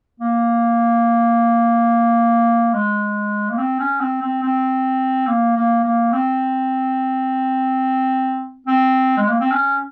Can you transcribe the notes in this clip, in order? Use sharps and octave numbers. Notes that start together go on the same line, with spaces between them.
A#3
G#3
A#3
C4
C#4
C4
C4
C4
A#3
A#3
A#3
C4
C4
G#3
A#3
C4
C#4